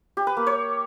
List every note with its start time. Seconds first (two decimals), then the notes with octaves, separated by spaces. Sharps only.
0.17 G4
0.27 B4
0.37 A#3
0.47 C#5